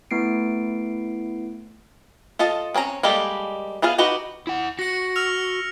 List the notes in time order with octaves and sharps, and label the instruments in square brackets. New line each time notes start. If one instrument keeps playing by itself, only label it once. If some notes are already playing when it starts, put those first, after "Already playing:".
[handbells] A3 B3 E4 C7 D7
[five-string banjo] F4 A4 D#5 A5
C4 C#4 D#4 A#5
G3 G#3 A#3 G4 A4
B3 F4 G#4 F5
D#4 F#4 G4 B4
[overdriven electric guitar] E4 F#5
[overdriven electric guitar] F#4 [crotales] A#6 C#7
[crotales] E6 F6 F7